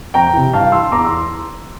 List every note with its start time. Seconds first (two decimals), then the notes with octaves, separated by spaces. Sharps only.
0.14 F2 G5 A#5
0.33 C3 E3
0.53 G2 F5 A5
0.72 E3 C6 E6
0.91 E2 A#5 D6
1.05 C6 E6
1.11 E3